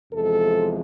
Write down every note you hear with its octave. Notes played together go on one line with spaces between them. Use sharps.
E2 C3 F3 G#3 A4